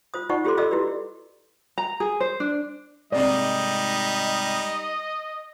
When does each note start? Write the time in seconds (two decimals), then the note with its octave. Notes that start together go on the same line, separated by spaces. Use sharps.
0.14 F4 C5 D#6
0.29 D#4 F4 C5 D5 F#5 C#6
0.45 F4 G4 A4 C5 C6 D6
0.57 F4 A4 D5 D#5 D6 E6
0.71 E4 F#4 G4 B4 D5
1.78 A#5
2.00 G#4
2.20 C5
2.40 D4
3.12 G#2 C3 G3 C4 D#4 D5 D#5